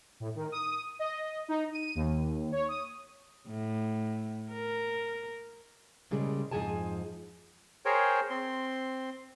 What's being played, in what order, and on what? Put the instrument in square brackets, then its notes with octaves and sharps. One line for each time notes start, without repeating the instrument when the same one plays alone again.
[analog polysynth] A2
D#3
D#6
D#5
D#4
D#7
D#2
C#5
D#6
[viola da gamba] A2
A#4
[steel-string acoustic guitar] A#2 C#3 G3 G#3
F2 G#2 F3 G#4 G#5 A5
[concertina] G#4 A#4 C5 C#5 G5
C4 C6